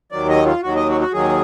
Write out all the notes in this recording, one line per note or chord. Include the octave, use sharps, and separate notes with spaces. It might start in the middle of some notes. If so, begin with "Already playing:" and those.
D#2 D#3 F#3 D5
D#5
F4
D#2 D#3 F#3 F#4
D#5
F#4
F#4
D#2 D#3 F#3 G#4